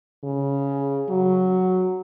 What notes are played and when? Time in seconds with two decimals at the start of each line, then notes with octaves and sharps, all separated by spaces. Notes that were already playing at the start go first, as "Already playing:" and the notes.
0.24 C#3
1.09 F#3